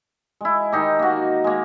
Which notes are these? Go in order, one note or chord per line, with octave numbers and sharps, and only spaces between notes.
G#3 E4
D#3 D#4 G4
A#3 F#4
G#3 A#3